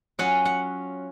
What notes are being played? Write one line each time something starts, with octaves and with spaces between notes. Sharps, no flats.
F#3 C#4 F4 F#5
F#5